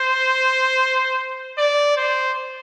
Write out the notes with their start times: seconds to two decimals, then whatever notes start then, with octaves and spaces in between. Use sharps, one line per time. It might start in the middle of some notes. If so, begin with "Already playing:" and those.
Already playing: C5
1.58 D5
1.97 C5